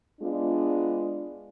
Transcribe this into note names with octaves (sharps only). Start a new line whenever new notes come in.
G#3 B3 D4 F4 D5